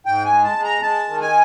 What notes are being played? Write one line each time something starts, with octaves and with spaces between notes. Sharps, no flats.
G#2 G5
G#5
G#3
A5
G#3
A#5
G#3 A5
D#3
G#5